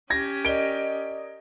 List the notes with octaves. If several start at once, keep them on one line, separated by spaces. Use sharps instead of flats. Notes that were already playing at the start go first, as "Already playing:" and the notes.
C#4 G4 G#6 A#6
A#4 D5 D#5 D7 G7